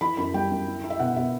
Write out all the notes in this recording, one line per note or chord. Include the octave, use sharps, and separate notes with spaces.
E3 B5
F#2 B5
G3 G5
F#2
E4
E4
E5
B2 F#5
B2 E5